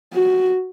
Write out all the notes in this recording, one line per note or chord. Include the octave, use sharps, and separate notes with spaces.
F#4